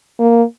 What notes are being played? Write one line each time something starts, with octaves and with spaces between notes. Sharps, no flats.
A#3